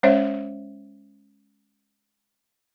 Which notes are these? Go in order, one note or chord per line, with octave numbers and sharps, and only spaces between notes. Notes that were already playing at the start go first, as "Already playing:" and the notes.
G#3 C#4 C5 C#5 E5